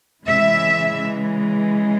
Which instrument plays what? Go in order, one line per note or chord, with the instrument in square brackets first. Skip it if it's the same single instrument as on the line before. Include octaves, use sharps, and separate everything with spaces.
[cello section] C#3 E3 G#3 E5